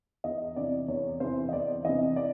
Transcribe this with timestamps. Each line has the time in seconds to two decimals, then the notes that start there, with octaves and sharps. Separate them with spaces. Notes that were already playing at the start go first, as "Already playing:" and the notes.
0.24 E2 D#5
0.56 C3 E3 D5
0.88 E2 C#5
1.20 C3 E3 C5
1.49 D#5
1.53 E2 D5
1.85 C3 E3 D#5
2.16 D5